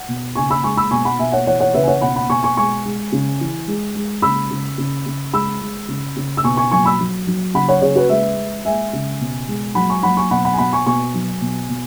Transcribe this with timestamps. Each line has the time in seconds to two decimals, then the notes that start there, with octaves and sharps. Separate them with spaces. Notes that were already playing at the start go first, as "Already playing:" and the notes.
Already playing: F#5
0.08 B2
0.35 C#3 G#5 C#6
0.50 B5 E6
0.63 G#3 G#5 C#6
0.77 B5 E6
0.91 B2 G#5 C#6
1.05 F#5 B5
1.19 B2 E5 G#5
1.32 C#5 F#5
1.47 E3 C#5 F#5
1.60 C#5 F#5
1.74 C#3 B4 E5
1.83 G#5
1.87 C#5 F#5
2.01 B2 F#5 B5
2.16 F#5 B5
2.30 B2 G#5 C#6
2.43 G#5 C#6
2.57 G#3 G#5 C#6
2.85 G#3
3.12 C#3
3.40 E3
3.67 G#3
3.95 G#3
4.22 C#3 B5 E6
4.50 C#3
4.78 C#3
5.06 C#3
5.33 G#3 B5 E6
5.61 G#3
5.88 C#3
6.16 C#3
6.37 E6
6.44 B2 G#5 C#6
6.57 G#5 C#6
6.71 F#3 G#5 C#6
6.85 B5 E6
6.99 F#3
7.27 F#3
7.54 C#3 F#5 B5
7.68 C#5 F#5
7.82 C#3 G#4 C#5
7.95 F#4 B4
8.09 G#3 B4 E5
8.37 G#3
8.65 G#3 E5 G#5
8.93 C#3
9.20 B2
9.48 G#3
9.75 F#3 F#5 B5
9.90 G#5 C#6
10.03 F#3 F#5 B5
10.17 G#5 C#6
10.31 B2 F#5 B5
10.45 F#5 B5
10.53 G#5
10.58 B2 F#5 B5
10.73 G#5 C#6
10.86 B2 G#5 C#6
11.14 F#3
11.41 B2
11.69 B2